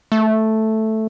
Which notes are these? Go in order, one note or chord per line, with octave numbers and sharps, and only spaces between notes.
A3